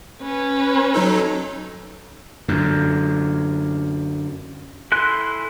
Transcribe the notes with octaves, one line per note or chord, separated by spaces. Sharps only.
C#4 B4
F#3 D#4 A4
F#2 D3
E4 A4 G#5 C6 F#6